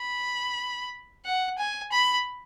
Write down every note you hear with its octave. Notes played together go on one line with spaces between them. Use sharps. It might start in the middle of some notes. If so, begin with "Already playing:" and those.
Already playing: B5
F#5
G#5
B5